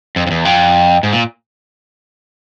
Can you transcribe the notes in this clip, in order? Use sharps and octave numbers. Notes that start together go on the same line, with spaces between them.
F2
F2
E2
F2
G#2
A#2